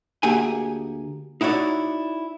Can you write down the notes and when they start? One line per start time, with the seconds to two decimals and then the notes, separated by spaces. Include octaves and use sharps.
0.23 D2 A#3 G4 G#4 F#5 G#5
1.41 D#4 E4 F#4 C#5 D5